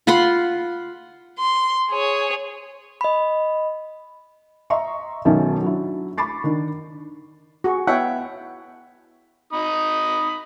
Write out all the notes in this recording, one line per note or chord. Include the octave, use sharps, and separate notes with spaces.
F4 F#5 B5 C6
C6
G#4 C#5
D#5 B5
D#5 E5 A#5 C6 C#6
B1 D#3 F#3 C#4 E5 A5
F#3 D4 E4
B5 C#6 D6 A6 C7
D#3 D4
F#4 G#4 C#6
B3 E4 C#5 E5 F#5 G5
D#4 B5 D#6